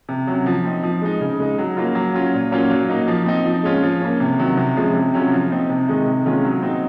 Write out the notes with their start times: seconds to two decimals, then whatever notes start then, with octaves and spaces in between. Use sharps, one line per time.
0.09 C3
0.27 F#3 C#4
0.46 F3
0.65 C4 D#4
0.83 F3
1.02 G#3 D#4
1.21 C#3
1.40 G#3 D#4
1.58 F#3
1.77 A#3 C#4 F4
1.95 F#3
2.14 C#4 F4
2.33 A#2
2.51 F#3 A#3 C#4 F4
2.71 F#3
2.89 A#3 D#4
3.08 F3
3.26 C4 D#4
3.45 F3
3.63 G#3 C#4 F4
3.82 F3
4.01 A#3 C#4
4.20 C3
4.39 D#3 F#3
4.57 C3
4.76 F3 G#3 C#4
4.95 C3
5.14 F#3 C#4 F4
5.32 F3
5.51 C4 D#4
5.70 C3
5.88 D#3 G#3 D#4
6.06 C3
6.26 D#3 G#3 C#4 F4
6.44 F#3
6.63 C4 D#4